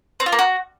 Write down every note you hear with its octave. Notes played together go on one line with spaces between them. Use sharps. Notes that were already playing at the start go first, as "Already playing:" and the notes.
C4
F4
A#3
F#4